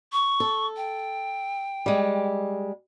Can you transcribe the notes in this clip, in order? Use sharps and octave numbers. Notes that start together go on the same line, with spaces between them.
C#6
A4
G5
G3 G#3